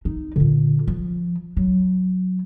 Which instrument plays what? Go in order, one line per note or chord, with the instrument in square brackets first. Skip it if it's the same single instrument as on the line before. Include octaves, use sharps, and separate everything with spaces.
[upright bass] D#4
A#2 D3
F3
F#3